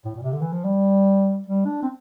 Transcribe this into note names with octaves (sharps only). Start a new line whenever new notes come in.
A2
A#2
C3
D3
E3
F3
G3
G3
D4
C4